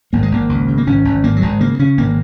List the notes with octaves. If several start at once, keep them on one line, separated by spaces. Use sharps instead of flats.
G#1 A#3
G#3
G#1 A#3
C#2
C#3
A#3
G#1 C#4
G#1
G#1 A#3
F#3
G#1 G#3
C#3 A#3
C#3 C#4
G#1 A#3